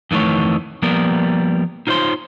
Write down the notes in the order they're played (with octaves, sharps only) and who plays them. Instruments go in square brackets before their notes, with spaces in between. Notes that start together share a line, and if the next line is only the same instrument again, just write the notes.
[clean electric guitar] F2 D#3 E3 A3 C#5
F3 G3 A#3 B3 A#4
D#4 F4 C5 C#5 C6